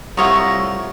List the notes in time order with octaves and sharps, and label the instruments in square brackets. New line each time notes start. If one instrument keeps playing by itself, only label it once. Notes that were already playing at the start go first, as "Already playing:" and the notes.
[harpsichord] C2 F4 [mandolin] A3 C#5 A#5 [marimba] F#5 C#6 D#6